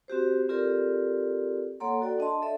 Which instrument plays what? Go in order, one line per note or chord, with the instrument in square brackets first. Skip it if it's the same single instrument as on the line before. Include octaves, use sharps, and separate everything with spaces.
[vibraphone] C4 F#4 G4 C5
C4 F4 G4 A4 A#4 D5
A#3 A4 C#5 F#5 A#5 C6
F#4 A4 D5 G5
D4 D#5 A5 C6
A4 D5 E5